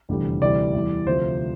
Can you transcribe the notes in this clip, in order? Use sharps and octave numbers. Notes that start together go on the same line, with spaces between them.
F1 E2 D3 G3
D2 C3 E3 G3 D5
E2 E3 G3
D2 C3 F3 C5